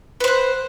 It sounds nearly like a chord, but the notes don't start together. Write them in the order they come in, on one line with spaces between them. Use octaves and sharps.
B4 C5 F#5